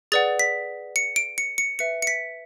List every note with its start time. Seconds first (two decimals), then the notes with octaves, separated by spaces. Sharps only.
0.12 G#4 B4 D5 F#5 A6
0.39 B6
0.96 C#7
1.16 D7
1.38 C#7
1.58 C#7
1.79 B4 E5 C#7
2.02 C#7
2.07 B6